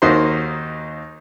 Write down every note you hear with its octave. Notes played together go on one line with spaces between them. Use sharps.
D#2 A#3 D#4 F#4 C5 C6